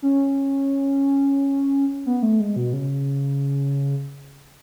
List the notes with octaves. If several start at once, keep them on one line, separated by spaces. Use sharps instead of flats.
C#4
B3
A3
G#3
B2
C#3